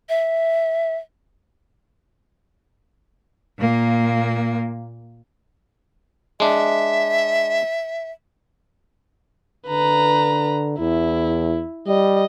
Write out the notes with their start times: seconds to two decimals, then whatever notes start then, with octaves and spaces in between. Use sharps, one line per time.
0.09 E5
3.59 A#2 A#3
6.40 G#3 D4 E5
9.68 D3 B4 A#5
10.79 E2 E4
11.87 G3 D#5